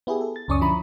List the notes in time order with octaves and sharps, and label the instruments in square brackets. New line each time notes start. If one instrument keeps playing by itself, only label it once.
[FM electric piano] B3 E4 G4 G#4
A4
A6
C#2 F#2 C#4 D5 C#6 D#6
D3 F3 E4 A#5 B5